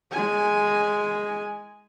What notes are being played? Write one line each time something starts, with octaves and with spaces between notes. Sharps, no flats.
G#3 G#5